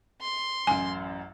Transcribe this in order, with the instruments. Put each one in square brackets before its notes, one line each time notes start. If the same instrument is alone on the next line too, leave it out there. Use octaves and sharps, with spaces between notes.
[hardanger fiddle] C6
[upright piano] A1 F#2 [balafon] G#5